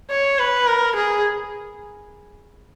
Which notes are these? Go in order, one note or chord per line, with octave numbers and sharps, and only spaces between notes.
C#5
B4
A#4
G#4